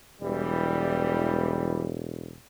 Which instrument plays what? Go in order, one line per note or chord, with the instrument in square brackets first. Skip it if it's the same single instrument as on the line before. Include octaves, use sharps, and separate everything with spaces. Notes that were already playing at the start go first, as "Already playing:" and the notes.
[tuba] E1 [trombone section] E3 G3